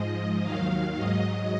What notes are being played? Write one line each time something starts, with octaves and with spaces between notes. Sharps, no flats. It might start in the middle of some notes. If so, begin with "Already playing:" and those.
Already playing: G#2 F3 G#3 D#5
D#2 D#3 F#3 F5
G#2 F#3 D#5